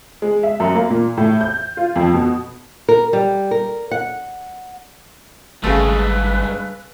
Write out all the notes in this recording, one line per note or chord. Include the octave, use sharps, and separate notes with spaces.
G#3
E5
F#2
A#3
A#2
A2
G6
F4
F2
B2
A#4
G3
A#4
F#5
G#1 G2 C#3 G#3 A3 B4